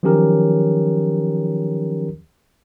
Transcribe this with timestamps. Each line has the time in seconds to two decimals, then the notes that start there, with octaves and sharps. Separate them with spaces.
0.03 D#3 F3 F#3 C#4 G4 A#4